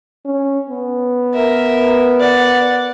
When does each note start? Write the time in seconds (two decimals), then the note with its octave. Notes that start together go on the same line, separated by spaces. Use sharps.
0.25 C#4
0.70 B3
1.34 A#4 E5
2.20 D5 F#5